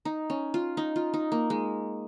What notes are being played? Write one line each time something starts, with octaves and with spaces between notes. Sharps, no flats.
D#4
C#4
F4
D#4
F4
D#4
A#3
G#3